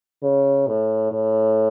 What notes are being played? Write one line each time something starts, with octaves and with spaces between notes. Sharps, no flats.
C#3
A2
A2